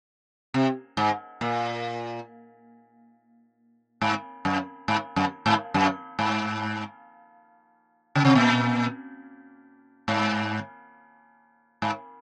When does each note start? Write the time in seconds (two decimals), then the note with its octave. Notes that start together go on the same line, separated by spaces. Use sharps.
0.54 C3
0.97 G#2
1.41 A#2
4.02 G#2
4.45 F#2
4.88 G#2
5.16 F#2
5.46 G#2
5.74 F#2
6.19 G#2
8.15 C#3
8.25 C3
8.35 A#2
10.08 G#2
11.82 G#2